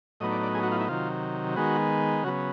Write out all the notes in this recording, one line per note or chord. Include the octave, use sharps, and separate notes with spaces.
A2 F#3 B3 D#4 D#5
D5
D5
G#4
F#4
F4
E4
C3 D#3 F#3 F4
D#3 G#3 B3 F#4
C#3 F#3 B3 F#4